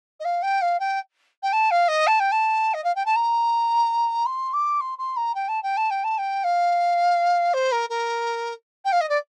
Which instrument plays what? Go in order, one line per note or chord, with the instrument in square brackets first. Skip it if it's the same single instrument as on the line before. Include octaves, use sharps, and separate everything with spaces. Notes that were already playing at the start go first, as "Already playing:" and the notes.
[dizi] D#5
F5
G5
F5
G5
G5
A5
F5
D#5
A5
G5
A5
D#5
F5
G5
A5
A#5
C6
D6
C6
C6
A#5
G5
A5
G5
A5
G5
A5
G5
F5
C5
A#4
A#4
G5
F5
D#5
D5